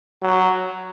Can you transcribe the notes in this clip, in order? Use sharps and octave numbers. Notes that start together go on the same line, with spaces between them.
F#3